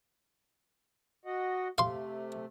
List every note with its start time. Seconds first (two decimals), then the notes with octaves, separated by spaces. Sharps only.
1.25 F#4 D#5 F#5
1.78 C3 A3 F5 C6